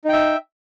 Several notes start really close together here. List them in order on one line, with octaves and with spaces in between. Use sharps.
D#4 G5 E5